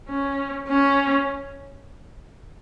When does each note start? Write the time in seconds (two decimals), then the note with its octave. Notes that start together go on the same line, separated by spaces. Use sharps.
0.09 C#4
0.68 C#4